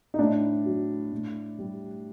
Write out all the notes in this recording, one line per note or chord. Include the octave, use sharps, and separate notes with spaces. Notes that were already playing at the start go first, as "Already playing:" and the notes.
D#4
A2 D4
F#3
A2
G3